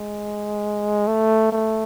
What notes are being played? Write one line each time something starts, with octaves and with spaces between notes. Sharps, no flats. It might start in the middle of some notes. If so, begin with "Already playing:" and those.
Already playing: G#3
A3
A3